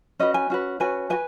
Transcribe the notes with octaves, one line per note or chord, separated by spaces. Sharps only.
C#4 F#4 B4 D#5
G#5
C#4 F#4 B4
C#4 F#4 B4 G#5
F#4 B4 G#5